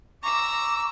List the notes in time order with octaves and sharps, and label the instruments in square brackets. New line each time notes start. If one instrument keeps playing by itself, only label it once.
[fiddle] A#5 E6 [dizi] C#6 [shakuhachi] D6